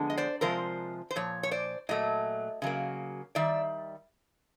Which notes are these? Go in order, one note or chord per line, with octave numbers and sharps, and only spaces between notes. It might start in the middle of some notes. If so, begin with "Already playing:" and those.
Already playing: D3 F3 G#3 B3
D#5
C5 D5
C3 F3 G#3 A#4 C5
C5
A#2 F3 C#5
C#5
C5 D5
A#2 F#3 A3 D#5
C#3 F#3 A#3
D#3 G3 D5 E5